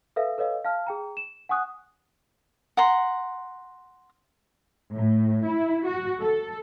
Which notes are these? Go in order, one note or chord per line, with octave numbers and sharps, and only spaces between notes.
A4 B4 E5 F5
A4 B4 C#5 D#5 F5
F5 A5 F6
G#4 G5 A#5
E7
F#5 G#5 C#6 D#6 F#6
F#5 A#5 C6
A2
E4
F#4
A4